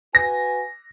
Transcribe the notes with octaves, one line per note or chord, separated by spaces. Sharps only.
F#4 B4 G#5 A#6